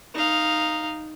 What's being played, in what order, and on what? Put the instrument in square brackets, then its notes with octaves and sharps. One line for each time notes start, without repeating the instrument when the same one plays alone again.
[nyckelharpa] D#4 F5